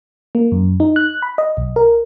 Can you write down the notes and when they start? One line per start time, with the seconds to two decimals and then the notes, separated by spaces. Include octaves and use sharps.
0.35 A#3
0.52 F#2
0.80 D#4
0.96 F#6
1.22 B5
1.38 D#5
1.57 B1
1.76 A#4